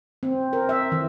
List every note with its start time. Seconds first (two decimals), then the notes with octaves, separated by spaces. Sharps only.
0.23 C4
0.53 A#4
0.69 E5
0.92 E3